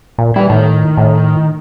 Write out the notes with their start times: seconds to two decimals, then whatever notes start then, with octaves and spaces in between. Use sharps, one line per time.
0.18 A#2
0.36 G3 E4 B4
0.50 A2 D#3
0.97 A2